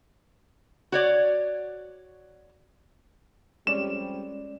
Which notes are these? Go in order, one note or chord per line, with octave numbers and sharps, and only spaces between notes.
F#4 C#5 D5
F2 G3 G#3 C#4 D5 E7